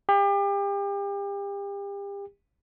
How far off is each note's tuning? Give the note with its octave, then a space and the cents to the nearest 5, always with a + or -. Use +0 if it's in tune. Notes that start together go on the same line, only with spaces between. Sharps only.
G4 +35